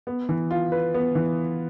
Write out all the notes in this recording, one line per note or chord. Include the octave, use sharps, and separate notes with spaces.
B3
E3
F4
B4
B3
E3